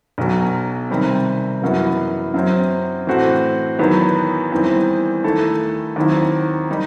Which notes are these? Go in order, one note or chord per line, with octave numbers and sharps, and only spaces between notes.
B1 B2 F#3
C3 D#3 G3 C4
F#1 F#2 E3 B3 F#4
F#2 F#3 C4
A2 E3 A3 C4 F#4
E2 D#3 F#3 B3
E2 D#3 G3 C4 E4
D#2 D#3 A3 E4 A4
D#2 D#3 F#3 C4 E4
D#3 G3 D#4